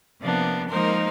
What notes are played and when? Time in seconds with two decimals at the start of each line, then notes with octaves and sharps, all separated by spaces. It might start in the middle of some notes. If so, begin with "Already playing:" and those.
0.22 C3 F3 A#3 B3 D4
0.69 F3 G#3 A#3 D#4 A#4 C5